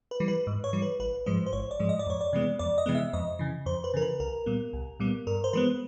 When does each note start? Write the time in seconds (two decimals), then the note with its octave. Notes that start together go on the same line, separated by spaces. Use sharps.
0.11 B4
0.20 E3 G3
0.28 B4
0.47 G#2
0.64 C#5
0.73 E3 G3
0.82 B4
1.00 A1 B4
1.26 G#2 F3 G#3 C5
1.46 C5
1.52 A1 C#5
1.71 D5
1.79 G#2 F3 G#3
1.89 D#5
1.99 D5
2.07 F2 C#5
2.21 D5
2.33 C3 E3 G#3 B3
2.59 F2 D5
2.78 D#5
2.86 C3 E3 G#3 B3
2.95 E5
3.13 F2 D#5
3.39 C#3 E3
3.66 F2 C5
3.84 B4
3.94 C#3 E3 A#4
4.02 B4
4.20 C2 A#4
4.46 A#2 G3 B3
4.73 C2
5.00 A#2 G3 B3
5.27 G2 A#4
5.44 C5
5.53 E3 G#3 B3 B4